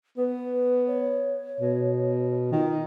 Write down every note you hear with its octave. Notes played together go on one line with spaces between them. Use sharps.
B3 B4
C#5
B2
D#3 F4